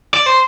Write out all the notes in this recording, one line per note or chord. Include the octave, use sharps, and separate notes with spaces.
D5
C5